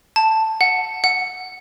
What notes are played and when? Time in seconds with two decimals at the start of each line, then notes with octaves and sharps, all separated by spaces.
0.16 A5
0.61 F#5
1.04 F#5